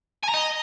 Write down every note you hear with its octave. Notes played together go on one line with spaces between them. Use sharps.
G#5
A#5
D#5